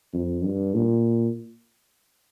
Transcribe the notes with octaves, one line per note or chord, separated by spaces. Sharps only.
F2
G2
A#2